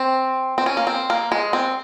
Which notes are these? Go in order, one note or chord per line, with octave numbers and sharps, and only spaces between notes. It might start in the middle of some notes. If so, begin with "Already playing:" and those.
Already playing: C4
C4
C#4
A#3
C4
A#3
G#3
C4